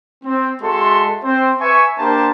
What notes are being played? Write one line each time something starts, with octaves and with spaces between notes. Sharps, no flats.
C4
G#3 F#4 A4 E5 C6
C4 C5
B4 E5 G#5 C#6
A#3 D4 G4 A#4 C5 A5